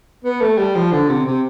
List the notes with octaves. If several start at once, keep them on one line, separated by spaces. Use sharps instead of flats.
B3
A3
G3
F3
D3
C3
C3